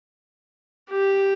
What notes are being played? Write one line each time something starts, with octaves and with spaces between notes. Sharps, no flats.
G4